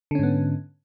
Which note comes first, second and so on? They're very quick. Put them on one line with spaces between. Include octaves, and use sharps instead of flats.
D3 C#4 G#2 B3